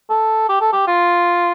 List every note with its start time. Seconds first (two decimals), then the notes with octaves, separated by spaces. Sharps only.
0.10 A4
0.49 G4
0.61 A4
0.73 G4
0.88 F4